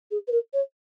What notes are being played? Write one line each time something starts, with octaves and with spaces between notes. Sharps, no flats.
G#4
B4
A#4
C#5